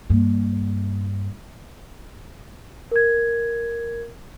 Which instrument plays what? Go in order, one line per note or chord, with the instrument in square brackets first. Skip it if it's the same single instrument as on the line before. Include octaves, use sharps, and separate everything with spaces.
[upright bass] G2 A#3
[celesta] A#4 G#6